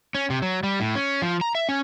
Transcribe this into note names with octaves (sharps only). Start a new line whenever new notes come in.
C#4
C3
F#3
G3
A2
C#4
F3
A#5
E5
C#4